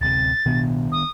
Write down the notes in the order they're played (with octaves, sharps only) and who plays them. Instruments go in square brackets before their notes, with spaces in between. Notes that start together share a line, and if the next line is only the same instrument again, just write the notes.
[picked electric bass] D1 C3 [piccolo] A6
[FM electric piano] B2 [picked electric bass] D#3 B3 D4
[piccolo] D#6